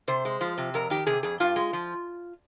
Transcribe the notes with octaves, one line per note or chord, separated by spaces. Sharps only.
C3 C5
G#3
F3
C3
F2 A#4
D#3 G4
C3 G#4
F2 G#4
G2 F4
G#3
F3